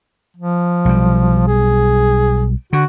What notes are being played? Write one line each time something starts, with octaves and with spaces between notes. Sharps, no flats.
F3
B1 G3
G#4
D3 F#4